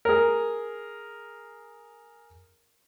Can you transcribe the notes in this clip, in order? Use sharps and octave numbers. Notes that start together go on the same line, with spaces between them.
G#4 A#4